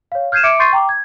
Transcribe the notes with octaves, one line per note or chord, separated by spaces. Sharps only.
C#5 F5
F6 G6 G#6 C7 D#7 E7
E5 D6 C#7 D7
C6 C#6 G6 A6 C7 D#7
G5 A#5 D6
G#6